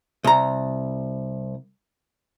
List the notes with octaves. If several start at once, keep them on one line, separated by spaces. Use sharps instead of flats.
C2 A#5